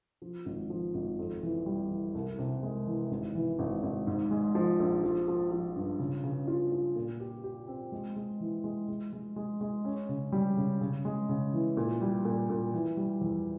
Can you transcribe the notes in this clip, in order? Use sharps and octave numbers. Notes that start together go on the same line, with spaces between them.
F3
G#1
F3
G#1
F2
E3
G3
E3
C2
C3
G#3
E3
G#1
E3
G#1
G#1
G#2
G#3
F3
A#1
F3
F3
F3
G2
C#3
C#3
F4
F4
A#2
G4
G4
C4
G#3
G#3
E3
G#3
G#3
G#3
G#3
G#3
C#4
C#3
G3
C#3
C#3
G#3
C#3
E3
A#2
G3
A#2
A#2
E3
G3
E2